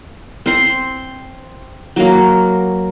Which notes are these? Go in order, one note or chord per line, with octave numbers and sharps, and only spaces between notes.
C4 C6
F#3 A#3